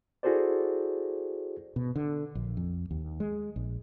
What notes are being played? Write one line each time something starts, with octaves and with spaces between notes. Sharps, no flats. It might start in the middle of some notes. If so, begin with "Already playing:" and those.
E4 F#4 G#4 A4 C5 D5
B2
D3
A#1
F2
D#2
G#3
A#1